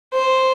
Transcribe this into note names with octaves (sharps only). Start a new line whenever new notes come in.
C5